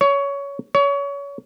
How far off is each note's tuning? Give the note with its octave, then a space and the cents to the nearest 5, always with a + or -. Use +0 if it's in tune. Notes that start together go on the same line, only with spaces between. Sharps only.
C#5 +15
C#5 +25